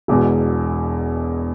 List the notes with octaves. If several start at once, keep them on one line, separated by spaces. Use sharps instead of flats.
E1 E2 B2 G#3